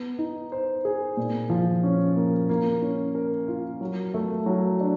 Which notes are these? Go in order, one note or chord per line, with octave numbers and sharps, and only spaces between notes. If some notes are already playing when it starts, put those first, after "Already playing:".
Already playing: B3
D#4
C5
G#4
A#2
F3
C#4
A#3
A#3
C#4
A#4
F4
F#3
A3
F#3
D4